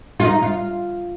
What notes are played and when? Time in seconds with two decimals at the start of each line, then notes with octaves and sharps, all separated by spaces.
0.20 F4
0.25 D#4
0.42 F4